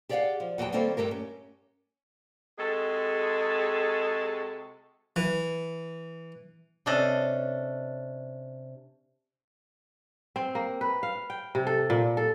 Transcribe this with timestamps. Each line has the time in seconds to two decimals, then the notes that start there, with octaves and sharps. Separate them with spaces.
0.09 G4 G#4 D5 D#5 F5 F#5
0.40 F3
0.58 E2 F#3 F#4 G4 G5 A5
0.73 D#3 G3 A#3 C4 A4 C5
0.97 G2 A3 G4 A#4
1.11 C#4
2.58 C3 G#3 F#4 G#4 A4
5.16 E3
6.86 C3 C#4 D4 A4 D#5
10.36 C4
10.55 A#3
10.81 B4
11.03 F5
11.30 G5
11.55 C3
11.67 A4
11.90 A#2
12.17 A4